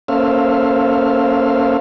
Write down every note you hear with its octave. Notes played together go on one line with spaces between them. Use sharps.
A#3 C#4 A4 C5 E5 F5